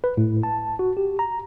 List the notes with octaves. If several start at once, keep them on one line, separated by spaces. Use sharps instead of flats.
B4
A2
A5
F#4
G4
A#5